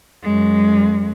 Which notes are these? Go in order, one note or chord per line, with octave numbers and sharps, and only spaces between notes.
F#2 G#3